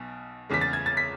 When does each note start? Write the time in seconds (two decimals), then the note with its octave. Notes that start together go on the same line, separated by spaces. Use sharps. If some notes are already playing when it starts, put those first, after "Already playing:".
Already playing: B1 B2
0.50 E2 C#3 G#3 B6
0.61 A6
0.73 G#6
0.86 A6
0.97 B6